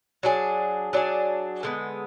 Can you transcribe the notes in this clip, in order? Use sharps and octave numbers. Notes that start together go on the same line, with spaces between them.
F#3 D4 G#4
F#3 D4 G#4
D3 G#3 B3